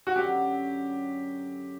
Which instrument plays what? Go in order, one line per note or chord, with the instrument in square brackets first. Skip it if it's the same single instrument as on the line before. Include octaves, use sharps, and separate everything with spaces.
[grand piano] F#4
[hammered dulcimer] F#2 D3 F#3 [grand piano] G4